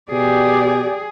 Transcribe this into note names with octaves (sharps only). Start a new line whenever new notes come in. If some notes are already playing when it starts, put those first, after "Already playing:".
B2 G4 G#4 D5